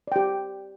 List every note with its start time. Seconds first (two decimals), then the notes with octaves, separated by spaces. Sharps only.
0.07 D5
0.12 G5
0.16 G4